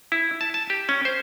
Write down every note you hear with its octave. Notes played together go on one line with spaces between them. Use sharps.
E4
A5
A5
G4
C#4
C5